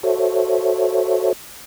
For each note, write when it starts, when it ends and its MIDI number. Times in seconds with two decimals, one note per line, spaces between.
0.03 1.33 66
0.03 1.33 69
0.03 1.33 72
0.03 1.33 73
0.03 1.33 76